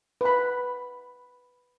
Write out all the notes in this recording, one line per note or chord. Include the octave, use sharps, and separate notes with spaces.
B4 B5